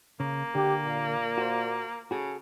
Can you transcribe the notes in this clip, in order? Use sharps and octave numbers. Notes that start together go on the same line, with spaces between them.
C#3 A#3
D3 G4
A#2
F#4 C5
C#3 F#4 G#4 A4